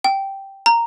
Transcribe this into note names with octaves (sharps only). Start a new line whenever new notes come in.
G5
A#5